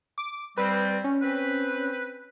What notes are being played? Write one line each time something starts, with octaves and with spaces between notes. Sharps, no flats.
D6
G3 C4 B4
C#4
C4 B4